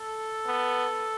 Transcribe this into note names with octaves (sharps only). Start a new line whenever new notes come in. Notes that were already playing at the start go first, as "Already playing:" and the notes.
Already playing: A4
B3